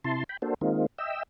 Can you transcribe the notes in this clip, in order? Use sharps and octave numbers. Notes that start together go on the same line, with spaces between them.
C3 E4 A5 C6
G5 B5
A#3 D4 F#4 A4 C5
D#3 G#3 A#3 C4 D#4 F4
D#5 E5 G5 E6